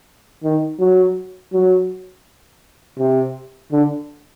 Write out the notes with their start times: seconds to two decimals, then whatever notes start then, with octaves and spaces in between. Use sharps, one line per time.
0.44 D#3
0.80 F#3
1.53 F#3
2.99 C3
3.72 D3